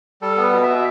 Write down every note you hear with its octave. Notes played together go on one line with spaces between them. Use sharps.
G3 A4
B3
B4
B2
E5
B2